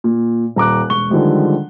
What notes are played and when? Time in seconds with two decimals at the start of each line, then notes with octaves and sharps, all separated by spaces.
0.04 A#2
0.56 D#1 A#5 D6 F#6
0.90 E1 C#6 G7
1.10 D3 D#3 F3 G3 G#3